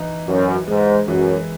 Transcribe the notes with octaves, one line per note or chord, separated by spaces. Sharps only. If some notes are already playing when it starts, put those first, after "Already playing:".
Already playing: E3 D#4
F#2 E3
G#2 G#3
F#2 E3